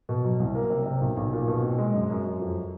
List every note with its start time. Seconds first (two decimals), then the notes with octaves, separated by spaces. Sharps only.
0.09 B2
0.24 F#3
0.40 C2
0.55 A#3
0.70 C3
0.86 C3
1.01 B1
1.17 B1
1.33 A#2
1.48 B2
1.63 C4
1.78 G#3
1.94 F#2
2.10 F#2
2.25 F#2
2.41 F2